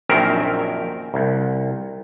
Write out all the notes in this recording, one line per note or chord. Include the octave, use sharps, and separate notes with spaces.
A#1 F#2 D#3 C4 A#4 E5
C2